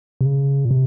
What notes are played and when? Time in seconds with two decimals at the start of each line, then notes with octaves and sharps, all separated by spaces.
0.21 C3
0.25 C#3
0.65 A#2
0.71 C3